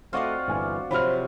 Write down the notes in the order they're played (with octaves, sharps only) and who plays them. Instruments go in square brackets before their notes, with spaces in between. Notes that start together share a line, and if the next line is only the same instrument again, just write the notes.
[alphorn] A3 [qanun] C4 D#5 F5 [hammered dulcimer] F4 F#4 D5
[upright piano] G1 G#5 F6 [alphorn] E3
[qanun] C3 F3 F#3 [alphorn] C5 [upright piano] B5 F6